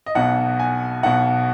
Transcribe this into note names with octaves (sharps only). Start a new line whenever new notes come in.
D#5
B1 B2 F#5
G#5
B1 B2 F#5